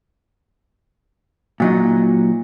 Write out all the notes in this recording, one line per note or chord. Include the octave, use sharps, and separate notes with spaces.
A#2 F#3 D#4